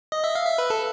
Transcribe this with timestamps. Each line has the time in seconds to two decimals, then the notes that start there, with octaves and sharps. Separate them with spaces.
0.12 D#5
0.24 E5
0.35 F5
0.46 E5
0.58 B4
0.70 A4